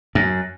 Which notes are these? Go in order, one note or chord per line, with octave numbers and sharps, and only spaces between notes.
F#2